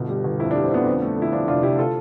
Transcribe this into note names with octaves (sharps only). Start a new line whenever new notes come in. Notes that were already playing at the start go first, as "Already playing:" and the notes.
Already playing: G1 B2
G3
G1
F2 E4
G3 D4
C4
D3 B3 D4
F2
A3
D3 E4
F2 D4 F4
F1 D4 F4
F1 E4 G4
F4 A4